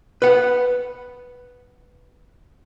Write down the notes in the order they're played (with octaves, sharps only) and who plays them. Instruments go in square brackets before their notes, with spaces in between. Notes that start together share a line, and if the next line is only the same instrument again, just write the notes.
[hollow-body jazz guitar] B4 F#5